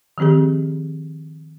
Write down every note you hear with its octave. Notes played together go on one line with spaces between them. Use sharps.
D#3 F3 C4 G4 G#4